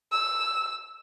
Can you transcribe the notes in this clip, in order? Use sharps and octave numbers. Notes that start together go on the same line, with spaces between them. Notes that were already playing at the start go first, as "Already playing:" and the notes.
E6